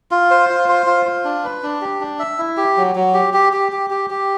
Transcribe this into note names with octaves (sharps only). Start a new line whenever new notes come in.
F4
C5
F4
C5
F4
F4
D4
B4
D4
G4
D4
E5
E4
G4
F#3
F#3
G4
G4
G4
G4
G4
G4